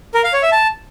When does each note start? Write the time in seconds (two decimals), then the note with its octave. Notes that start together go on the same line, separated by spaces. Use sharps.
0.14 A#4
0.24 F5
0.33 C#5
0.43 E5
0.52 A5